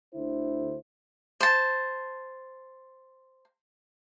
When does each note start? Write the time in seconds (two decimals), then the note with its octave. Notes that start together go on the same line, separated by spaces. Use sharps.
0.15 D2 D3 E4 C5
1.41 C5 A5